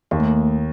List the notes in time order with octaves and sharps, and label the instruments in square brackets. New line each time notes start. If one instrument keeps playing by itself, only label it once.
[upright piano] D#2 [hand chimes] A#3
[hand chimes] A3